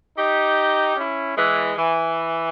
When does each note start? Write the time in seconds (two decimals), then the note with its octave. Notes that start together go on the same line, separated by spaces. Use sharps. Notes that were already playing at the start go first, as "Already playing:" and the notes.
0.17 D#4 G4
0.96 C#4 E4
1.37 E3 G#3
1.77 E3